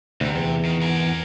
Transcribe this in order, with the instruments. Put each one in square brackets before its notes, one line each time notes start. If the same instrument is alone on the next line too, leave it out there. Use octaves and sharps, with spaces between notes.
[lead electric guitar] D2 [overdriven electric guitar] C3
[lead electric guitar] E2
[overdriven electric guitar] D#3
A#4 G#5